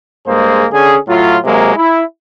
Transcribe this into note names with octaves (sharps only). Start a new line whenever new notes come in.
G2 G#3 A#3 G#4 C5
D3 C#4 G#4
A2 F#3 F4
C3 F#3 G#3 A#3
E4